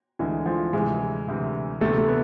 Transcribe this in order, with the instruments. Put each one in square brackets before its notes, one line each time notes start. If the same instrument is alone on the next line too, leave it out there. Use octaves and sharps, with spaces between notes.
[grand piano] D2 D3 G#3 [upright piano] E3
[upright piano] F3
[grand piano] D2 C3 E3 [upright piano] G#3
[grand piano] D2 C3 E3
[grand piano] D2 C3 E3 [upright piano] A3
[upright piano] A3
B3